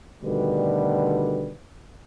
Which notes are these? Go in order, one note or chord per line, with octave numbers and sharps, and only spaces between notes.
D2 B2 D3 D#3 G3 B4